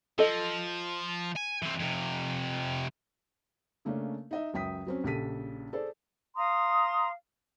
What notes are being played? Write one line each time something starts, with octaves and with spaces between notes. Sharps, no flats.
F3 A4 D#5
G#5
E3 C4
F2 C3
C#3 A3 A#3 C#4 D4
D#4 D#5 E5
C#2 F#2 E5 G5 D#6 B6
F#3 C4 C#4
A#1 C#3 G4 A4 B6 D#7
G#4 A4 C5 D5
F5 A#5 C6 D#6